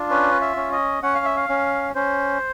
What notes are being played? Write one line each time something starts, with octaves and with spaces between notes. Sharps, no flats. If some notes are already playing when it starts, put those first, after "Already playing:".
Already playing: D4 F4
C#4 B4
E5
C#4
D#5
C#4 F#5
F5
E5
F5
C#4
C#4 C5